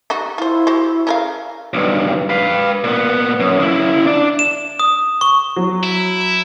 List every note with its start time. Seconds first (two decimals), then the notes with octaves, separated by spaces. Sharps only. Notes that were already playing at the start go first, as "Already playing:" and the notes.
0.10 G3 D#4 F#4
0.38 E4 F4 C5
0.67 F#4 G4 C5
1.07 C#3 A#4 F5
1.73 B1 G2
2.29 B4 F5
2.84 A#2 B3
3.40 F#2
3.60 C#3 E4
4.07 D4 D5
4.39 E7
4.80 D#6
5.21 C#6
5.56 F#3
5.84 E4